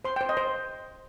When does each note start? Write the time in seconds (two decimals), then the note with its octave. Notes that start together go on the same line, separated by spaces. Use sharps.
0.05 C5 C6
0.16 C5 G5
0.29 D#5
0.37 C5